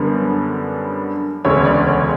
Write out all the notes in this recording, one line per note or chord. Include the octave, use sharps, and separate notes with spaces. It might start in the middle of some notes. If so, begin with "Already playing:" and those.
Already playing: F#2 D3 G3 B3 A#4
E1 D2 C#3 C#5
D5
C#5